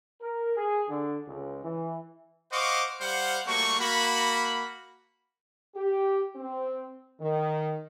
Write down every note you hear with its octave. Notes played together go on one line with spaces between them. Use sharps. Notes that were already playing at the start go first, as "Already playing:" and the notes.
A#4
G#4
D3
C#2
E3
C5 D#5 F5 F#5 C#6 D6
G3 C5 F5 F#5
G3 A3 A#3 F#4 C#6
A#3 F#4 B5
G4
C4
D#3